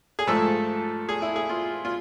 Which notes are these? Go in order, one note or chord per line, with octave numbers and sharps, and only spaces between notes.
G#4
G#2 F3 A3 A4
G#4
E4
G#4
F4
F4